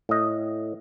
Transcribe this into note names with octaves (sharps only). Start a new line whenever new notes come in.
A2 D#5